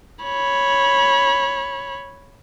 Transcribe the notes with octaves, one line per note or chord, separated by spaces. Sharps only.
C#5 B5